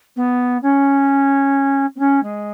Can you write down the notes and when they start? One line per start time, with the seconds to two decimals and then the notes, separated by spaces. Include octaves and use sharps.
0.16 B3
0.62 C#4
1.95 C4
1.99 C#4
2.23 G#3